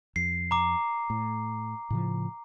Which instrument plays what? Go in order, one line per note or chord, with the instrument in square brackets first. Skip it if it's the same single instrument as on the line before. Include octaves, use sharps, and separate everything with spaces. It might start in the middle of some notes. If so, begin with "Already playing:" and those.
[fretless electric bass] F2 [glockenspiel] C7
[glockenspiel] A#5 D6
[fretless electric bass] A2
A2 C#3 F3